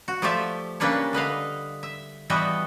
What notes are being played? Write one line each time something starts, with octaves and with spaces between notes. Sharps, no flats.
F#4
F3 A3 F4 G4 D5 E5
C#3 G3 A#3 D4 B4 C#5
D3 B4 D#5 F5
E5
E3 G3 B3 F#4 D#5 E5